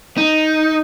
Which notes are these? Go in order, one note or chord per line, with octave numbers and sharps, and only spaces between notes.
D#4